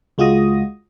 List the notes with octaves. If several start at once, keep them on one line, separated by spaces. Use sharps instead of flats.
C#2 G#3 F4 F#4 D#6 A#6